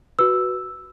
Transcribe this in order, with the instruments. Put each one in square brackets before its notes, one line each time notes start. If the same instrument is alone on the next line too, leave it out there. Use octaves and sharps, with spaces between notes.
[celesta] F#4 B4 E6